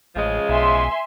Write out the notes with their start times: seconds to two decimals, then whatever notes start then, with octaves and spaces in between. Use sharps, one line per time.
0.16 A1 C#3 F3 G#3
0.49 B1 E5 G#5 C6